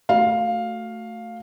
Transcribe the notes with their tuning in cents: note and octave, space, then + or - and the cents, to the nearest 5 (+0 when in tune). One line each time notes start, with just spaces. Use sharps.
A3 +15 F#4 +0 F5 +5